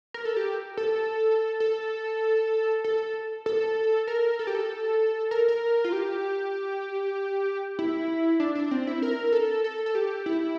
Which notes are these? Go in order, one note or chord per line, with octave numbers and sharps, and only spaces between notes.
A#4
A4
G4
A4
A4
A4
A4
A#4
A4
G4
A4
A#4
A#4
F4
G4
E4
D4
D4
C4
E4
A#4
A4
A4
A4
G4
E4